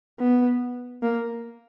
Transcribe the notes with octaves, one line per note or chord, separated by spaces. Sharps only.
B3
A#3